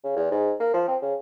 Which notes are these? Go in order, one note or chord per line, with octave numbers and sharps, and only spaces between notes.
C#3
E2
G#2
A#3
F3
C4
C#3